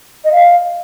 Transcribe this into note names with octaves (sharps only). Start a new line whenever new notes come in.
D#5
F5